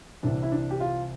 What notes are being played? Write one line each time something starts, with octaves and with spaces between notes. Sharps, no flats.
C2 C3 E3 D4
E4
D4
G4
F4